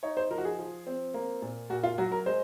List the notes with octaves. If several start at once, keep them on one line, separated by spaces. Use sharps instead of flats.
D#4 C#5
C5
F3 A#4
F#4
G#4
F3
C4
A#3
A#2
A#2 F#4
F4
F#3 F#4
A#4
G#3 C5